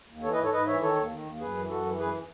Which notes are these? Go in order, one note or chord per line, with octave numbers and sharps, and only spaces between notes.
D#2
E3 A4 C#5
B4 D#5
G#2
A4 C#5
G#2 B4 D#5
E3 C#5 E5
D#3 A4 C#5
D#2
D#3
D#2
F#2 G#4 B4
E3
F#2 F#4 A4
E3
F#2 G#4 B4